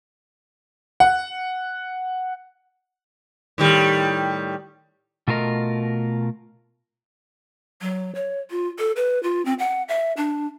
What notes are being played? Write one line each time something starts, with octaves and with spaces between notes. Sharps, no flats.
F#5
A2 D#3 G3
B2 A3 F4 A#4 D#5
F#3
C#5
F4
A4
B4
F4
C4
F#5
E5
D4